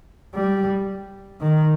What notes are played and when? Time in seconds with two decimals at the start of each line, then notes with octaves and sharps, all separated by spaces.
0.35 G3
1.41 D#3